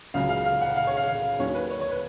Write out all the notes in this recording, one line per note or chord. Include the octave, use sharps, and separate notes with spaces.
C#2 C#3 F#3 F5
F5
F5
F#5
F5
C#5
F5
F5
D#2 D#3 F#3 C#4 C#5
B4
C#5
C#5
B4